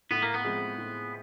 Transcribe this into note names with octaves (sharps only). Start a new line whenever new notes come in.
A2 B3
A#3
B3
F3 G#3 C4
A2